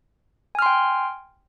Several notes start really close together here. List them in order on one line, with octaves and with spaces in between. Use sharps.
G#5 F6 C6 G5